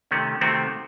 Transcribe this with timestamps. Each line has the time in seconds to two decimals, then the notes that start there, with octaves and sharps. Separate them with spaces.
0.11 C3 D#3 A3 C#4
0.41 C3 D#3 A3 C4 F#4